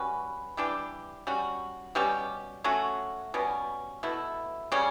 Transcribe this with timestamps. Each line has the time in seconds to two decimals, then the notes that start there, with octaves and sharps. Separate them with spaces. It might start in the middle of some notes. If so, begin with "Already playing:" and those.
Already playing: G3 C#4 F#4 B4
0.57 E3 G3 D4 G4
1.27 G3 C#4 F#4
1.95 B2 G3 C#4 G4
2.64 F#3 A3 C#4 F#4
3.34 B2 G3 C#4
4.03 B2 A3 E4
4.72 C#3 G3 C#4